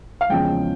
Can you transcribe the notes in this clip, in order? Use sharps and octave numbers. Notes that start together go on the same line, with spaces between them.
F5
E2 C#3 F3 G#3 G5